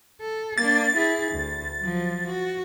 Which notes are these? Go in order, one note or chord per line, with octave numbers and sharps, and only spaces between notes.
A4
A#3 D4 A6
E4 G#4
D2
F3 F#3
F#4